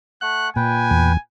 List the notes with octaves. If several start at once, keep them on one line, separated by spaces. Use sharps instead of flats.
A3 F#5 F#6
A#2 B4 G5 G#5
E2